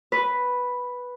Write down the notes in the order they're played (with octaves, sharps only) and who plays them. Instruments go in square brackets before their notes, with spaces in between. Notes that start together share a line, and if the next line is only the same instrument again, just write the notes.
[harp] B4